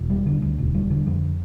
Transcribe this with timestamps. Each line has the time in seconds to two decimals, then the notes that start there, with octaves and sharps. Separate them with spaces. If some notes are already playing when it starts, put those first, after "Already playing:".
Already playing: E1
0.10 G3
0.26 D3
0.42 D2
0.58 E1
0.74 G3
0.90 D3
1.06 F2